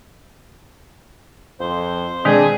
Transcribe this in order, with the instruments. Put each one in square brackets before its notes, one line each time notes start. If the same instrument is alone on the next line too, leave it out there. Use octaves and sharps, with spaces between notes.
[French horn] F2 [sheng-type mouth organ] C5
[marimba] B2 D#3 G#3 [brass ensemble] C4 G#4 [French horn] D4